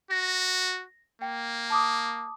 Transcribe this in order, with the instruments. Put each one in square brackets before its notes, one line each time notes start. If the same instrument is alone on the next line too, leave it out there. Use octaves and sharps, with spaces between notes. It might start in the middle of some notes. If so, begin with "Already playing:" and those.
[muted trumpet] F#4 [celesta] A#6
[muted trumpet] A#3 [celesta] G5
[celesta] A5 D6 D#6